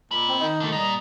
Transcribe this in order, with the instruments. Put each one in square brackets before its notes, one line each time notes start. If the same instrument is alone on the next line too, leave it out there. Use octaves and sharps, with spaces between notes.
[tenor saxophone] A#2 [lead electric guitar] D#5 B5
[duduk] C4
[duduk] D#3 [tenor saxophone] D#4
[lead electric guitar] D3 A3
[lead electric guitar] A#2 [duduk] G3 [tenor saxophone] D#5